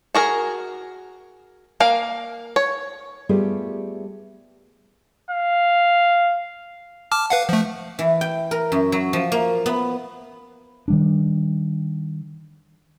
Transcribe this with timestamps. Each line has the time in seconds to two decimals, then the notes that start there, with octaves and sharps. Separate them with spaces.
0.15 F#4 G#4 A#4
1.80 A#3 A#4 F5
2.56 C#5
3.29 G3 A3 B3 F4 G4 G#4
5.31 F5
7.12 A5 D6 F6
7.30 B4 F5 F#5
7.49 F3 A3
7.99 E3
8.21 G5
8.51 A#4
8.72 F#2
8.92 F#3
9.13 F3
9.32 A#3
9.66 B3
10.88 D#3 G3 D4